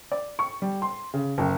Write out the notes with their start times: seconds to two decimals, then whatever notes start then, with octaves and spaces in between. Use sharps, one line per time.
0.12 D5
0.39 C#6
0.62 G3
0.82 C6
1.14 C#3
1.38 F#1